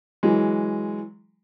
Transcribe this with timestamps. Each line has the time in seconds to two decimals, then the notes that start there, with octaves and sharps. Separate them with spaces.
0.23 E3 F#3 G#3